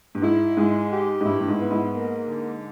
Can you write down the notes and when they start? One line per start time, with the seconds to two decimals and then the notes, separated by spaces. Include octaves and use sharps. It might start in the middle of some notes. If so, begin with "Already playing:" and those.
0.15 G2
0.22 G#2 E4
0.56 G#2 G#3
0.91 G4
1.21 G#2
1.25 G2 E4
1.41 G2
1.49 G#2
1.59 B3
1.71 G#2
1.94 A#3
2.29 D3